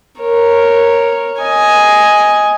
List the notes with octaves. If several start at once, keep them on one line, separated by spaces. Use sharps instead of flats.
A#4 C#5
D#5 G#5